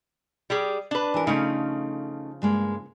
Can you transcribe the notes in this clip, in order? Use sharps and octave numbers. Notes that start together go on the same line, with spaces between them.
G3 G4 G#4
D4 B4
E3 A#4
C#3 F3 A3 C#4 D#4
G2 G#3 A#3